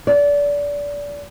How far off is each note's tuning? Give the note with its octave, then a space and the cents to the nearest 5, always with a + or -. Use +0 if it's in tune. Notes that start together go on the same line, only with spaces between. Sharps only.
D5 -25